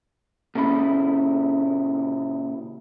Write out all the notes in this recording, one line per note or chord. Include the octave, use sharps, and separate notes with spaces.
A#2 C#3 E4 C5 B5